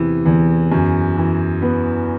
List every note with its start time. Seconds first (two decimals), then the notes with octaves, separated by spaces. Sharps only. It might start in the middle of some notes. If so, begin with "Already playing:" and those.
Already playing: E2 C3 E3
0.26 E2
0.72 F#2
1.17 E3
1.62 B3